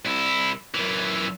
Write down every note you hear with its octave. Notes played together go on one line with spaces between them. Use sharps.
C2 E4
F#2 E3